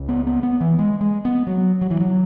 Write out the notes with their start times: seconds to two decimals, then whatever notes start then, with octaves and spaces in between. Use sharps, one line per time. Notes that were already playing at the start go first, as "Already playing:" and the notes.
Already playing: C#2 C#3
0.09 B3
0.27 B3
0.43 B3
0.61 E3
0.79 G#3
1.01 G#3
1.25 B3
1.47 F#3
1.81 F#3
1.90 E3
2.00 F#3